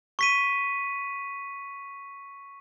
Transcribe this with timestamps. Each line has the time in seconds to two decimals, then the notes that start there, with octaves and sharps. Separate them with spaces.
0.19 C#6 B6 D#7